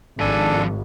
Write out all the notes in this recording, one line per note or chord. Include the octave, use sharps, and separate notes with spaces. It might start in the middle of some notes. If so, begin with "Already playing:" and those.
G#1 F3 D4 A4 G#5